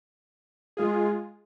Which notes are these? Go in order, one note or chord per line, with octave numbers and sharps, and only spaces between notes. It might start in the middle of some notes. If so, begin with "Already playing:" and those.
G#3 F4 G#4